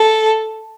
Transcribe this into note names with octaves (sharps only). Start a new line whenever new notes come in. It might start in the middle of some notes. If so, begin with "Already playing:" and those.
Already playing: A4